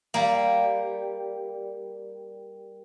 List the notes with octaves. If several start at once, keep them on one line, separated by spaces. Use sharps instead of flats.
G3 A#3